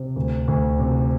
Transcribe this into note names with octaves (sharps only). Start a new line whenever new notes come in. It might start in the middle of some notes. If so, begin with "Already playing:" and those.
Already playing: C3
D2
D2
C3